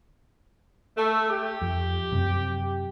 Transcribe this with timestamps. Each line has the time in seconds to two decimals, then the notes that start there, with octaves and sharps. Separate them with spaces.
0.97 A3
1.30 G4
1.62 F2
2.12 F#2 C3